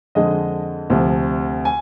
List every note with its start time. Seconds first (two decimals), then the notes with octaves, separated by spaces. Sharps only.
0.15 F2 D3 G#3 D#5
0.90 D2 C3 F3
1.65 G#5